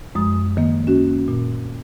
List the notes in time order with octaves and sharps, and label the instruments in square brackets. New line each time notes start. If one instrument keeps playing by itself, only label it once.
[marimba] F#2 F3 G#3 D#6
D#3 A#3
C#4 F#4
A#2